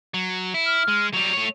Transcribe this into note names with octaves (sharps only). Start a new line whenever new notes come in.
F#3
E4
F6
G#3
F#3 G3 F7
A3 C#5